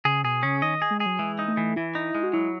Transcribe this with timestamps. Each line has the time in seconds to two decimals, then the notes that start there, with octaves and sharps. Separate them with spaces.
0.05 C#3 G#4
0.24 B2 G#4
0.43 C#3 C#4
0.62 D#3 D#5
0.82 G#4
0.91 G#3
1.00 G#4
1.06 F#3
1.19 E3 G#3
1.39 D#4
1.48 A3
1.57 E3
1.76 E3 E4
1.95 D#4
2.15 G#3
2.23 F#4
2.33 F#3 E4